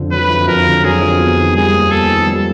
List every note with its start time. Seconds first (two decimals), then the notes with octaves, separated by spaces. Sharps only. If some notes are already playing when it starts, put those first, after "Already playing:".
Already playing: F2 D3
0.12 F#3 B4
0.30 F2
0.48 F2 A#4
0.67 D3
0.84 F#3 G#4
1.02 F2
1.19 B3
1.38 D#3
1.56 G3 G#4
1.74 D#2
1.91 B3 A4
2.09 D#3
2.27 G3